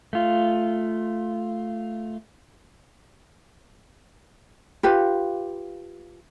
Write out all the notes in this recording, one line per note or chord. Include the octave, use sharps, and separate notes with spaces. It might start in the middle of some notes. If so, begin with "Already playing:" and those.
A3 F4
F4 G4 B4 F5